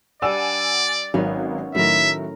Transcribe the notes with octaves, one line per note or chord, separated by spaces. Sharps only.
G3 D4 D5 F#5 G#5 E6
G#1 D#3 F#3 B3 C#4
A2 D#3 F#3 A3 A#4 E5